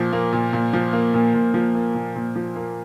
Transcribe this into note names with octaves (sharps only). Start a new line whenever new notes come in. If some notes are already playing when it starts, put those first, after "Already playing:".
Already playing: A#2 F3
A#3
A#2
A#2
F3
A#3
A#2
A#2
F3
A#3
A#2
A#2
F3
A#3